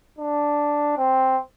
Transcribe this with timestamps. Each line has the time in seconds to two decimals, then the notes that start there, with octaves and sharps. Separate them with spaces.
0.18 D4
0.97 C4